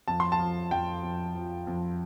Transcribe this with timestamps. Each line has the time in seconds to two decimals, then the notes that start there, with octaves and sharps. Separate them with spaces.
0.08 F2 A5
0.20 C6
0.32 A5
0.39 F3
0.71 F2 G5
1.03 F2
1.35 F3
1.67 F2